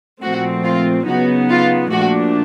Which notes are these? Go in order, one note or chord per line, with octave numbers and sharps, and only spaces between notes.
A#2 F3 A3 C4 F#4
F4
C#3 F#3 B3 D#4 F#4
F4
A#2 F3 A3 D4 F#4